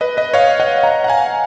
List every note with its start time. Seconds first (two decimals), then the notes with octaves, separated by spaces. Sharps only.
0.01 B4 D#5
0.17 B4 D#5
0.33 C#5 F5
0.60 D#5 F#5
0.84 F#5 A#5
1.04 F#5
1.08 F5 G#5